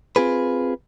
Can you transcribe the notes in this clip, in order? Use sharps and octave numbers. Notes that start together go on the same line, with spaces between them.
C4 F4 G#4 B4